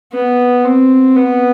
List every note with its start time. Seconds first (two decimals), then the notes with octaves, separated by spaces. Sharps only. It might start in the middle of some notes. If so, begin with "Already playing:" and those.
0.13 B3
0.65 C4
1.17 B3